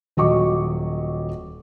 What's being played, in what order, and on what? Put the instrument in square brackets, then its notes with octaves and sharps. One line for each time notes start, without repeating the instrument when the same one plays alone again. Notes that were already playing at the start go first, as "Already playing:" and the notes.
[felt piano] D#1 F#3 D#5 C#6 D6